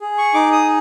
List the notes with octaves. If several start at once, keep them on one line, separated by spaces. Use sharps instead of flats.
G#4
C#6
D#4 D6
D#6